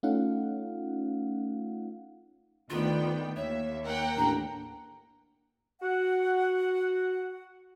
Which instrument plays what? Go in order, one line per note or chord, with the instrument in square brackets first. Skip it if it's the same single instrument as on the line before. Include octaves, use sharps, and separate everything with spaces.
[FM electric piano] A3 C#4 D#4 F4 F5 F#5
[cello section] D2 D#3 D5 [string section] B3 G5 [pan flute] F4
[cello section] D#2 [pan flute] C#5 [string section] E5
[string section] A#4 F#5 G5
[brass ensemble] A1 A#5 [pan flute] D4
[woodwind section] F#4 F#5